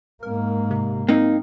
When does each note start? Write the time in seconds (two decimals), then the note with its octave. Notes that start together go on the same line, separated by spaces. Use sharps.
0.23 G#2 A#3 A#4
0.71 C3
1.09 A#3 C4 D#4